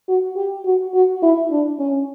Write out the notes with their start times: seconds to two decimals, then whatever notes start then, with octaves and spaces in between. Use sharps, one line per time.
0.09 F#4
0.36 G4
0.65 F#4
0.94 F#4
1.22 E4
1.51 D4
1.79 C#4